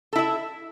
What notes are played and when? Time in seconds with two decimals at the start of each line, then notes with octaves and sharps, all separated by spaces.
0.13 A4
0.16 E4
0.18 E5